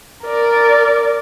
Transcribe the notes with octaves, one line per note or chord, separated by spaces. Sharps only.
A#4 D5